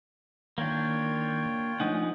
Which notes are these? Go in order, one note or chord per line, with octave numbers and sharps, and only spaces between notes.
D#3 A#3 D4 F4 C#5 G5 G#6
F3 A3 D4 D#4 F#5 G#5